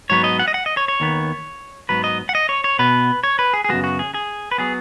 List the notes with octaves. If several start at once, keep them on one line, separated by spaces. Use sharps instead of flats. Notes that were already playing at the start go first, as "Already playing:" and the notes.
G#2 F#3 B3 C#5
D#5
F#5
D#5
F#5
D#5
C#5
C#5
D#2 D#3 B3
G#2 F#3 B3 B4
D#5
F#5
D#5
C#5
C#5
B2 B3 B4
C#5
B4
G#4
G#4
F#2 C#3 G#3 B3 F#4
F#4
G#4
G#4
B4
F#3 B3 G#4